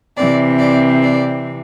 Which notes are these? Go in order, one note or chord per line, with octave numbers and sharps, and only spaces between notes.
C3 E3 C4 D5
D5
D5